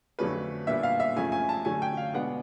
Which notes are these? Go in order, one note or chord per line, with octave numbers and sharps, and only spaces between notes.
F2 D3 F#3 A3 C#4 B4
A#2 G3 B3 D4 E5
F5
E5
F#2 C#3 F3 A3 C#4 G#5
G#5
A5
D3 F#3 A3 C#4 G#5
G5
F5
B2 G#3 B3 D4 F#5